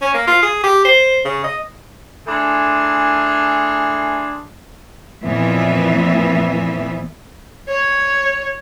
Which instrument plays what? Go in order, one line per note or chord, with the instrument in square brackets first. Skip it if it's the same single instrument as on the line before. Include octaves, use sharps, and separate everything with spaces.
[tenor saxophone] C#4
A#3
F4
G#4
G4
C5
C#3
D#5
[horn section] E3 A3 D4 G#4 C6
[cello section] F2 A#2 E3 B3 E5
[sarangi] C#5